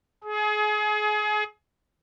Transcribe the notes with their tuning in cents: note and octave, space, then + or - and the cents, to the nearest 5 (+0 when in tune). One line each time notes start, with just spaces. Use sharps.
G#4 +30